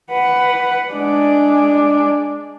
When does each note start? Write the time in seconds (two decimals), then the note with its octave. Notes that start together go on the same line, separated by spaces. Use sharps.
0.10 B4 F#5
0.92 G#3 D4